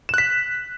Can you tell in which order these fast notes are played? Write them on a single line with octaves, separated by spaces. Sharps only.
E7 F#6 B6